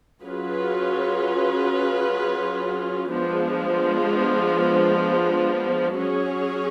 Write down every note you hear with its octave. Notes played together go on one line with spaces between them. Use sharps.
F#3 C#4 F4 G#4 B4
F3 G#3 B3 D4
F#3 C#4 G#4 C#5